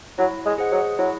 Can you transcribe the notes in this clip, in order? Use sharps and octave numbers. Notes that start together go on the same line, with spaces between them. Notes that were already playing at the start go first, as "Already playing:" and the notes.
F#3 E4
G#3
G#4 C5 D#5 F#5
F#3
F#3 E4